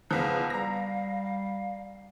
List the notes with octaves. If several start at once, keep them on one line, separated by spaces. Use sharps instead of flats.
E2 C#3 F3 F5
G3 A#5 A#6